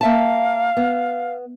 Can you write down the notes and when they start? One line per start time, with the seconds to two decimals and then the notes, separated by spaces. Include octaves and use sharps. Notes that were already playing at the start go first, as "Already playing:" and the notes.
0.01 A#3 E5 F5 A5
0.77 B3